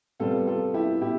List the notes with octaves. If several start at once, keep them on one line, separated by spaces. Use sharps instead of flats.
C3 G3 B3 F4 A4
F4 A4
E4 G4
B2 E4 G4